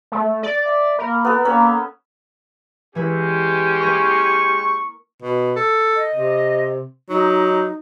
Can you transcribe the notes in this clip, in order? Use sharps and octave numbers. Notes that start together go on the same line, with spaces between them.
A3
D5 A6
E5
A#3 A#4 B5
B3 A4 B4
A#3 C#4 A#5
E3 G#3 C#4 E4 G4 B4
A#3 A#4 C#6 A#6
B2
A4
D#5
C3
F#3 D#4